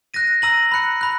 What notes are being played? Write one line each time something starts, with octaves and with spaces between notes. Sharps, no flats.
F#6 A#6 D#7
A#5 E6 A#6 D#7 F#7
B5 F#6 C#7
B5 F#6